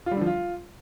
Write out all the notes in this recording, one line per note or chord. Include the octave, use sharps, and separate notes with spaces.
F4
G3
D3
F3
F4